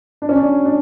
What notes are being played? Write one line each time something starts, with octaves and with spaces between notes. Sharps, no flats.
D4
C#4
D4
D4